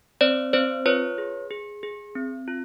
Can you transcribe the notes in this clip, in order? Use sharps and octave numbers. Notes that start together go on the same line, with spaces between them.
C4 C5 D5
C4 C5 D5
F4 B4 C#5
G#4
G#4
G#4
C4
F4